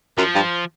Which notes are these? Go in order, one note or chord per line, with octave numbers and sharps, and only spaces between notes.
F#2 F3
G2